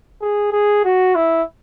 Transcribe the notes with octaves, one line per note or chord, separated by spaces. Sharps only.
G#4
G#4
F#4
E4